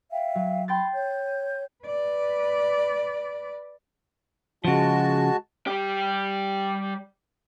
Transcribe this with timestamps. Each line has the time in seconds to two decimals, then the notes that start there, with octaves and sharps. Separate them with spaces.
0.12 E5 F5 G5
0.35 F#3
0.68 G5 B5 C6 A6
0.93 C#5 G6
1.85 B4 D5
4.65 C#3 F3 G#3 F#4 A5
5.67 G3 G4